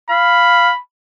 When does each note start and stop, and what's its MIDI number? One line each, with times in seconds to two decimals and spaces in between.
0.10 0.69 77
0.10 0.80 83